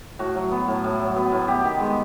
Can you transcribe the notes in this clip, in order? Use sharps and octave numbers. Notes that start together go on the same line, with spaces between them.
A2 F#4
F#3
B3
A2
A2
F#3
B3
A2
B3 G4
D#3
G#3